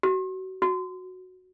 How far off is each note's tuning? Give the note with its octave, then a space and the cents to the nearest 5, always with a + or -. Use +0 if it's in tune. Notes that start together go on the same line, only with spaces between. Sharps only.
F#4 +30
F#4 -5